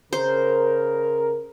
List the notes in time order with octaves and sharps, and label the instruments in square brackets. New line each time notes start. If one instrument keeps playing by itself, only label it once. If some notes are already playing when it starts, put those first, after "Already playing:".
[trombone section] C#3 A#4 [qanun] C5